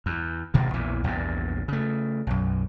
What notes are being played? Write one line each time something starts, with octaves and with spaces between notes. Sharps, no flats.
E2
A1 G2 B2 D#3
A#1 E2 A#2 E3
A#1 E2 G2 A#2
C#3 A3
B1 F#2